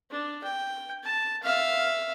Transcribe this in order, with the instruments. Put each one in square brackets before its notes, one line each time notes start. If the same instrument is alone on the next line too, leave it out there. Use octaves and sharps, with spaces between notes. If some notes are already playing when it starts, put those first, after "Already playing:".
[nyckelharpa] D4
G5
A5
E5 F5